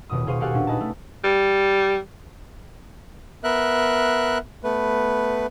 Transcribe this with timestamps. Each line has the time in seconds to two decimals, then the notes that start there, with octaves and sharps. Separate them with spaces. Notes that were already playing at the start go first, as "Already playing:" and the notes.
0.10 D#1 B2 D#6
0.26 B2 G#4 C5 F5 C#6 D#7
0.40 F#4 G4 A4 F5 F#5 G#5
0.54 A#2 C#4 D4
0.67 D#4 B4 D#5 G#5 A5
0.80 A3
1.24 G3
3.44 B3 A#4 E5 F#6
4.64 A3 B3 B4